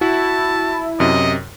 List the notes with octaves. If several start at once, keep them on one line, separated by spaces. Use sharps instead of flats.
E4 F#4 A5
F#2 C3 D#5